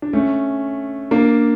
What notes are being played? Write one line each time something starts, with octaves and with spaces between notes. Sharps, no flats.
D4
A3 C#4
A#3 D4